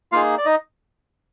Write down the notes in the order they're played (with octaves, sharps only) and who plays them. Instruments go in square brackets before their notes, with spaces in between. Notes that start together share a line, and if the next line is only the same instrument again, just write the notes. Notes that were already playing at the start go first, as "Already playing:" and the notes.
[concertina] A#3 D#4 F4 G#4 F5
D5
D#4 D#5